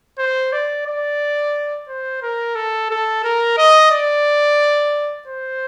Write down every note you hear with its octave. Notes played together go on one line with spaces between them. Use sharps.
C5
D5
D5
C5
A#4
A4
A4
A#4
D#5
D5
C5